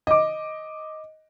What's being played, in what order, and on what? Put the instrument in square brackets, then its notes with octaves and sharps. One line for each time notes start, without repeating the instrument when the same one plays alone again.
[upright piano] D#5 D6